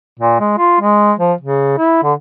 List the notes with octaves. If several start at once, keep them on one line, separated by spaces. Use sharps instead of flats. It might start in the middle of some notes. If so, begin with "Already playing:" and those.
A#2
G#3
F4
G#3
F3
C#3
E4
D3